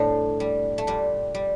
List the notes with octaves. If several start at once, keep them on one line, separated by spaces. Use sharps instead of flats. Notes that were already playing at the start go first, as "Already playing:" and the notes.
Already playing: A2 G3 A3 C4 D4
G3
A3
A#2 G3
G3